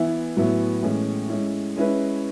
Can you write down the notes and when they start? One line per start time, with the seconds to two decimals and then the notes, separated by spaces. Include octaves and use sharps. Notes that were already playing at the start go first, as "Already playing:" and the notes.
Already playing: E3 B3 E4
0.37 A2 F#3 B3 E4
0.82 A2 E3 G#3 C#4
1.29 G#3 C#4 E4
1.76 G#3 C#4 E4 B4